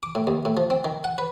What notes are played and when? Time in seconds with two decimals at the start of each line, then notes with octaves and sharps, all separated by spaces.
0.03 D6
0.15 A2
0.27 D#2
0.45 A2
0.57 F3
0.70 C4
0.85 D#3
1.04 F#5
1.18 B4